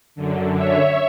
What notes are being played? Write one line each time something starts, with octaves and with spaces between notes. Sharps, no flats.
F#2 D3
C#5 E5